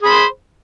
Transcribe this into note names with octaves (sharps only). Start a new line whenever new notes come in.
G#4 C5 B5